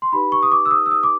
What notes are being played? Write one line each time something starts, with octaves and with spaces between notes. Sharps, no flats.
C6
D#4 G4 B4 B5
C#6
D#6
D6
E6
D#6
E6
D#6
D6